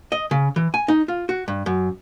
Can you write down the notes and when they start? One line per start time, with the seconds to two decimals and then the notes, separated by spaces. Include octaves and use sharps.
0.12 D#5
0.31 C#3
0.56 E3
0.74 G#5
0.88 D#4
1.08 F4
1.29 F#4
1.48 G2
1.66 F#2